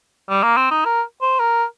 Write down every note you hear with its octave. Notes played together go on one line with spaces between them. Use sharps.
G3
A#3
C4
D#4
A#4
C5
A#4